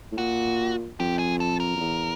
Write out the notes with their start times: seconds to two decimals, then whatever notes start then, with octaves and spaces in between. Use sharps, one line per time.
0.12 A2
0.18 A#2 F#4
1.00 F2 G4
1.19 G#4
1.40 A4
1.60 A#4
1.76 F2
1.80 E2